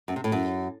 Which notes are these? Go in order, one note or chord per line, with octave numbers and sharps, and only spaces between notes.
F#2
C3
A2
F#2